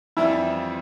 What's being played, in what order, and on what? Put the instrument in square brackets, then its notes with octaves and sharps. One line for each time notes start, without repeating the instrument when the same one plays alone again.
[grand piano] F2 E3 G3 C4 F4 [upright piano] E4